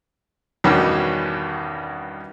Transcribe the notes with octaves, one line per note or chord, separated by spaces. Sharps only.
E2 G2 B2 D#3 G3 C#4